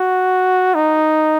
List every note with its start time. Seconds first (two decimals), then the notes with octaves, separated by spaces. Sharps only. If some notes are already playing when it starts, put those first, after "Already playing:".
Already playing: F#4
0.75 D#4